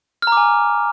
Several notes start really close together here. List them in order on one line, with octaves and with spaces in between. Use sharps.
F6 A#5 D6 G#5